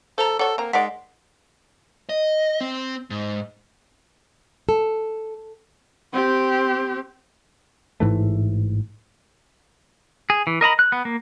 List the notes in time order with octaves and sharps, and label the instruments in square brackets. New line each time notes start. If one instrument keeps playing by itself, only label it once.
[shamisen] F3 [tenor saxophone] A4 [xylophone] C5 A#5
[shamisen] F#4 C#5 D5 [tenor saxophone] A4 [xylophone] F#5
[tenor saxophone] A#3 [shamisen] C4 A#5
[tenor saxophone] G#3 [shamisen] D#4 A#4 D5 [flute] F#5 [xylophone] B6 D7
[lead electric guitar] D#5
C4
G#2
[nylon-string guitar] A4
[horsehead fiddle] C4 G4
[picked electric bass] A1 G#2 E3 A3
[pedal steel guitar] G#4
E3
A#4 D#5 A#5 B5
F#6
B3
A#3